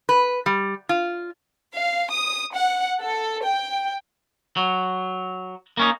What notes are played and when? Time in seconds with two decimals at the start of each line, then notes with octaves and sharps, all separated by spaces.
0.09 B4
0.46 G3
0.89 F4
1.75 F5
2.11 D#6
2.55 F#5
3.01 A4
3.43 G5
4.57 F#3
5.77 A#3 C#4 D#4